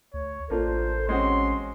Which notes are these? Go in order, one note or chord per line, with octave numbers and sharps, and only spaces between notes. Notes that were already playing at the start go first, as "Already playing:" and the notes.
D2 C#5
A1 A#3 D4 F4 A4 C5
G#3 C4 C#4 F#4 C6